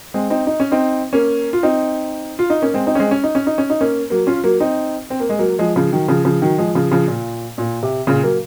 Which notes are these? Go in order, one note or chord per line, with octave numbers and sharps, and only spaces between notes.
G#3 C4
C4 D#4
D#4
C#4
C4 D#4
A#3 C#4
F4
C4 D#4
F4
D#4
A#3 C#4
G#3 C4
C4 D#4
C#4
G#3 C4
C#4
D#4
C#4
D#4
C#4
D#4
A#3 C#4
F#3 A#3
C#4 F4
F#3 A#3
C4 D#4
C4
A#3
G#3
F#3 A#3
F3 G#3
C#3 F3
D#3 F#3
C#3 F3
C#3 F3
D#3 F#3
F3 G#3
C#3 F3
C#3 F3
A#2
A#2
C3
A#2 C#3
F#3 A#3